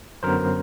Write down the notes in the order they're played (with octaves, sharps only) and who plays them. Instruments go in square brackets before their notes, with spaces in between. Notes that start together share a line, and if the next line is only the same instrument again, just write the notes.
[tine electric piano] F#2 D3 F#3 B3 A#4 C5